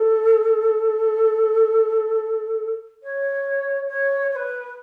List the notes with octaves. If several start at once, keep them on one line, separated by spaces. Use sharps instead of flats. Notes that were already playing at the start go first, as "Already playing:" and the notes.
Already playing: A4
C#5
C#5
C#5
B4